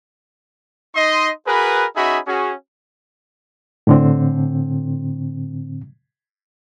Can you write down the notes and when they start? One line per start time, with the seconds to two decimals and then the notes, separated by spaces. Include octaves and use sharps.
0.95 D#4 D#5 C6
1.47 F#4 G#4 A#4 B4
1.96 C#4 D#4 F#4 G#4 E5 B5
2.26 C#4 F#4 G#4
3.87 A2 D3 C4